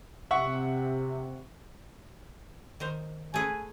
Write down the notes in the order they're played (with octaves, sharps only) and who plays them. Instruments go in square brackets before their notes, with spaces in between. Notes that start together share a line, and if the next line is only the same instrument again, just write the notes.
[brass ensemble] C3 [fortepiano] E5 F#5 C#6
[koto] D#3 A#4 C5
[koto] A3 G#4 B4 [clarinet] G#5